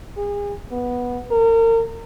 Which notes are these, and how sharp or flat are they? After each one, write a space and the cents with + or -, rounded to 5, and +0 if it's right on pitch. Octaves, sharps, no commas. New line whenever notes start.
G#4 -35
B3 -10
A#4 -35